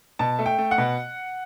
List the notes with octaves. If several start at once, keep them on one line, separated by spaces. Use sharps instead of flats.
B2 A5
A3
G5
A3
F#5
B2